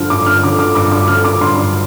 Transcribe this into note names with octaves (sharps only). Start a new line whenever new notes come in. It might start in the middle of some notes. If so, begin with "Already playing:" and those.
Already playing: G2 D3 F3 F6
G2 D6
F6
D3 F3 D6
D6
G2 D6
D6
D3 F3 F6
D6
G2 C6